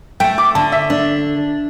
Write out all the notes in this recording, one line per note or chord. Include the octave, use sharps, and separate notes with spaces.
A3 G5
D6
D3 A5
E5
D4